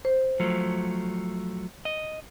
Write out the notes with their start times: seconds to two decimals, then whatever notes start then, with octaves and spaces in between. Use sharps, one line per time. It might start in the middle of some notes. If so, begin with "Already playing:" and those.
0.05 C5
0.40 F3 F#3 A3
1.85 D#5